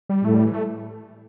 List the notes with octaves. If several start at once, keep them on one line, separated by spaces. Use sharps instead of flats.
G3
A2 A3
G3
E3
A3